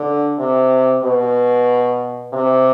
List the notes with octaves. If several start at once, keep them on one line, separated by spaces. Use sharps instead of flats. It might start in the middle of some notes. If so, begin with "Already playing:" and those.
Already playing: D3
C3
B2
C3